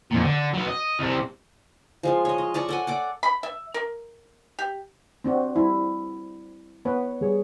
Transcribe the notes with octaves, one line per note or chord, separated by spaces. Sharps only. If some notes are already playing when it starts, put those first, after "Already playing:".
F2 A#2
D3
F#3 B4
D#5
C2 C3
F3 G#3 F4
C#5 D#5
D#5
D5 A5 A#5 C#6
A4 F#5 G#5
D5 F#5 D6
B5
E5
A#4
G4
C4 D4 F#4
G3 E4
B3 B4 C#5
G3 G#4 C#5